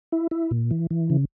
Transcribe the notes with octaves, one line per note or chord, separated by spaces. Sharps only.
E4
E4
A#2
E3
E3
C#3